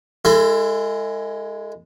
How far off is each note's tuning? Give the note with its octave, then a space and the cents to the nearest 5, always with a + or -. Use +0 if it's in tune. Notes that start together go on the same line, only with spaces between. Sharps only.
G#3 +0 E4 +25 A4 +40